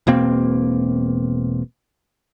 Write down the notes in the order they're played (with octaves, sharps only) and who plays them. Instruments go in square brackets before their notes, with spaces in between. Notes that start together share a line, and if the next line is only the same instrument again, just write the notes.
[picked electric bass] E1 B2 A#3 C4